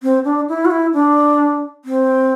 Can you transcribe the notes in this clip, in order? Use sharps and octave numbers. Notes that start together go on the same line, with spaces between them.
C4
D4
E4
F#4
E4
D4
C4